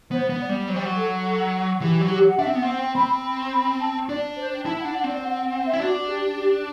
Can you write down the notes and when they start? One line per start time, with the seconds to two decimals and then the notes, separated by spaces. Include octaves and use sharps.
0.11 B3 C5
0.30 B3
0.39 D5
0.49 G3
0.68 F#3 C5
0.76 G3
0.85 F#3
0.96 A4
1.25 A4
1.81 E3 G4
2.01 F#3
2.11 G4
2.28 F#5
2.39 D4 E5
2.47 C4
2.55 B3 F#5
2.63 C4
2.77 G5
2.95 C4 B5
3.24 B5
3.52 B5
3.81 A5
4.09 D4 D5
4.37 C5
4.55 G5
4.66 E4 A5
4.81 F#5
4.85 D4
4.94 F#5
5.04 C4 D5
5.23 F#5
5.38 F#5
5.51 F#5
5.65 E5
5.73 E4
5.79 D4 F#4
6.08 G4
6.36 G4